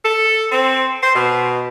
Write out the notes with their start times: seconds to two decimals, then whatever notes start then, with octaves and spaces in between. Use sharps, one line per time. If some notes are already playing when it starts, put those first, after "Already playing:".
0.04 A4
0.52 C4
1.02 C5
1.14 B2